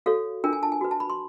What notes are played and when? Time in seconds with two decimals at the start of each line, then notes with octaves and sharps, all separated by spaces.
0.06 F#4 A4 C#5 F5
0.44 D4 F4 A#4 G5
0.53 G#5
0.63 A5
0.72 G#5
0.81 F#4 B4
0.91 A5
1.00 B5
1.10 C6